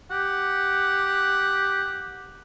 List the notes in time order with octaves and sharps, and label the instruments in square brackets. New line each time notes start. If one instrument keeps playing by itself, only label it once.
[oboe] G4 [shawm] F#5